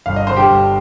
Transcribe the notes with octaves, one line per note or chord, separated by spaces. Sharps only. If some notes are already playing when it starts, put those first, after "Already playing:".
G1 F5
D#5
G2 D3 C5
G4
G1